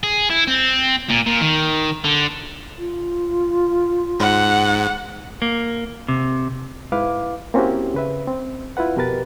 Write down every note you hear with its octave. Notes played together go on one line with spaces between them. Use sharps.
G#4
E4
C4
A#2
A#2
D#3
D3
F4
G#2 F#5
A#3
C3
G#2 E4 B4 F5 D6
A#3 C4 C#4 E4 F#4 G4
C#3 B4 E5
C4
E4 F4 B4 F#5
F2 B2 G4 A#4 B4 A6